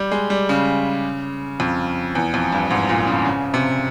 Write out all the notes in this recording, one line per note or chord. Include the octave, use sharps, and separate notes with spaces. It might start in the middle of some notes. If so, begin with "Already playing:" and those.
Already playing: G3
G#3
G3
C#3
F2
E2
F2
G2
G#2
A#2
C#3
C#3
C3